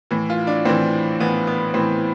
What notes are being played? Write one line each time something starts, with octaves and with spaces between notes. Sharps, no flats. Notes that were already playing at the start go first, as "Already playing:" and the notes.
A2 E3
F4
D4
A2 E3 C4
A2 E3 B3
B3
A2 E3 C4